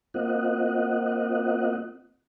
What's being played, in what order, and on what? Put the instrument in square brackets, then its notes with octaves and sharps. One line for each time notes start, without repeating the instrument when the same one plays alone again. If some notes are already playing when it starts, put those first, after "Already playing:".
[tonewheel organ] A#3 C4 F4 D#5 F#5